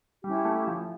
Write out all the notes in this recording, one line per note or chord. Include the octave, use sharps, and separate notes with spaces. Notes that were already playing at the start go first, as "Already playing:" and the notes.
G3 C#4 E4 G4
A3
F3